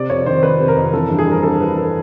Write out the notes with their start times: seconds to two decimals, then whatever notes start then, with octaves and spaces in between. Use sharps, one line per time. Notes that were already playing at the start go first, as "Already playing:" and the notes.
Already playing: C3 D5
0.10 F2 C#5
0.26 D#3 C5
0.43 F2 B4
0.60 C3
0.68 A#4
0.77 F2
0.93 E3 A4
1.06 G2 A#4
1.19 G#4
1.27 G3 A#4
1.43 G2 A4
1.61 E3 B4
1.77 A4